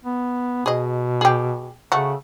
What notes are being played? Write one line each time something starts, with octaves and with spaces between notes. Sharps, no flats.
B3
B2 G#4 D#5
G4 G#4
C#3 A3 F#4